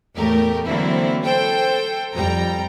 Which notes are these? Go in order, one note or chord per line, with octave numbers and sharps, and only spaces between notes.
E2 A2 A3 G4 A#4
D3 E3 F#3 A#3 C4 E4
A4 C5 G5
F2 G3 G5 A#5